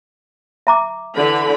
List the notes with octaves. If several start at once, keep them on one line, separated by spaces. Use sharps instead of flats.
E5 A#5 D6
D3 E3 B5